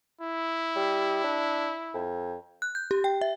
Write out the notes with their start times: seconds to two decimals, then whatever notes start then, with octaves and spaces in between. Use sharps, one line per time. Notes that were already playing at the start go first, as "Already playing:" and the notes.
0.21 E4
0.76 G3
1.24 D4
1.94 F2
2.62 F#6
2.75 G6
2.91 G4
3.04 G5
3.21 E5